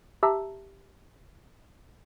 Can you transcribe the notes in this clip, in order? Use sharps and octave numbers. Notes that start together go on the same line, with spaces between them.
G4 E5 A5 A#5 E6